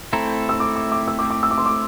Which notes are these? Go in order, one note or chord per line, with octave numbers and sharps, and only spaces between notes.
A3 C4 E4 A4 A#5
E6
D6
D6
D6
E6
D6
D6
E6
D6
C6
D6